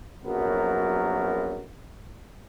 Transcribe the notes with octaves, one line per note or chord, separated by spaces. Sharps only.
A#1 F#2 F#3 B3 A#4